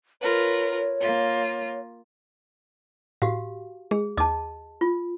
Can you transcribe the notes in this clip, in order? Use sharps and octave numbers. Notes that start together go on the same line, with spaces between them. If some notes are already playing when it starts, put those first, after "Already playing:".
F4 A#4 B4 C#5
A#3 F4
A2 F#4 G4 F5
G#3 G#4
D#2 D#5 A5 D6
F4